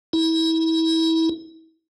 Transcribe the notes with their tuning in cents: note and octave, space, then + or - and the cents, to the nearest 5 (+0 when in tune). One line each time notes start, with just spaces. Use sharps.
E4 -30